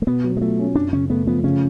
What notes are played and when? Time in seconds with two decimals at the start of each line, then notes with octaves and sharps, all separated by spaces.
0.02 A3
0.07 B2 B3
0.24 F#3
0.37 G#3
0.41 A3 F4
0.59 C#4
0.75 F#2 D4
0.93 C#3 C#4
1.10 A3 B3
1.27 F3 B3
1.44 C#3 C#4